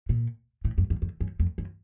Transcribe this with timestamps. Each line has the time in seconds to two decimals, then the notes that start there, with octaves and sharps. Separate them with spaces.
0.09 A#2
0.65 A2
0.78 F#2
0.90 F#2
1.02 F2
1.21 F#2
1.40 F2
1.58 F#2